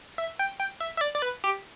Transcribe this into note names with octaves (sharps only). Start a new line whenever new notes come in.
E5
G5
G5
E5
E5
D5
D5
B4
G4